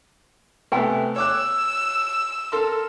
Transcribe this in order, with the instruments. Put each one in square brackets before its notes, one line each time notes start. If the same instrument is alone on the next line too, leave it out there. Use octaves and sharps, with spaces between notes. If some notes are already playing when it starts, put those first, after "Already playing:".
[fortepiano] C3 A3 B3 [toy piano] B4 G5 G#5
[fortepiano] C#5 D6 F#6 [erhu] E6
[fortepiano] A4 A#4 C6